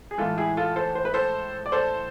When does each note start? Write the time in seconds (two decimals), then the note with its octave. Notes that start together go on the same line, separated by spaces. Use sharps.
0.11 G#4
0.18 A2 E3 G#3 F4 A4
0.38 E4 G#4
0.57 F4 A4
0.76 A4 C5
0.95 C5
1.05 B4
1.14 A4 C5
1.66 D5
1.72 A4 C5